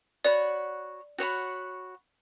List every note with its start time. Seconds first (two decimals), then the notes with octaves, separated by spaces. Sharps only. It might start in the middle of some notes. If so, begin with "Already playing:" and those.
0.25 F#4 C#5 D5 F#5 B5
1.18 F#4 C#5 F#5 B5